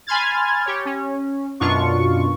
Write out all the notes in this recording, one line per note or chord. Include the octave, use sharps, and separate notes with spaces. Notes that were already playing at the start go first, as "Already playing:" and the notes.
G#5 B5 C6 F6 G#6 A6
G4 C#5
C#4
F#2 B2 D4 F4 C#6